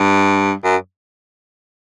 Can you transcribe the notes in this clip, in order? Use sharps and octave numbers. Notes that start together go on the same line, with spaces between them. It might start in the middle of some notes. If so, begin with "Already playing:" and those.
Already playing: G2
F#2